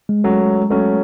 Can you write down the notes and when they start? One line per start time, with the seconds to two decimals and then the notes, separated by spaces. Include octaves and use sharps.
0.09 G#3
0.24 F#3 A3 C#4
0.70 F#3 A3 C#4